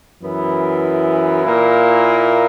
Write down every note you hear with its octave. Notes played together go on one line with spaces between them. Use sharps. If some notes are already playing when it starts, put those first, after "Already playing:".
F#2 E3 B3 E4
A#2 A#3 E4